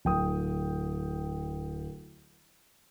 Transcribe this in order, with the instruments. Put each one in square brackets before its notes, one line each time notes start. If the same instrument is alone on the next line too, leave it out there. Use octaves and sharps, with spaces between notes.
[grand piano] D1 G5 D#6